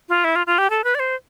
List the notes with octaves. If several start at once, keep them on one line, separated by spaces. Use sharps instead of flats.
F4
E4
F4
F4
G4
A4
B4
D5
C5